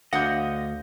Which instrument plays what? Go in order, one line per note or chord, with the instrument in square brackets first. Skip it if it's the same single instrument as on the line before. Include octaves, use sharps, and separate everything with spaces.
[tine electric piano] D2 [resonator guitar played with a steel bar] D3 F#5 [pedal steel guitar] D#5 [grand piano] F5 D#6 G6